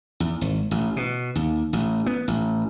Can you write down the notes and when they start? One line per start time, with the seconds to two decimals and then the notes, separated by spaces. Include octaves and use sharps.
0.20 E2
0.41 G#1
0.71 A1
0.96 B2
1.35 D#2
1.73 A1
2.06 B3
2.28 A1